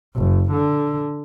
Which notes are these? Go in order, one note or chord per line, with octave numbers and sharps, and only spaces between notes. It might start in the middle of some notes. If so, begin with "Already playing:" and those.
F#1
D3